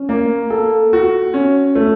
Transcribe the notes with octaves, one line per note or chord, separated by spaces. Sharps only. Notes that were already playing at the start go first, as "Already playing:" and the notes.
Already playing: C#4
A#3
A4
F#4
C#4
A3